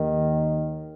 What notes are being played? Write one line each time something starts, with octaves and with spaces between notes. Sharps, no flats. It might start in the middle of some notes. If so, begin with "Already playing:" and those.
Already playing: D#2 D#3